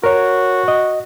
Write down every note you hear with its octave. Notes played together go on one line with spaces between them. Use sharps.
F#4 A#4 C#5
D#5